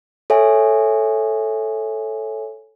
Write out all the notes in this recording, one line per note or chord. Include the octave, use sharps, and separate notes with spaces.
A4 C#5 E5 G#5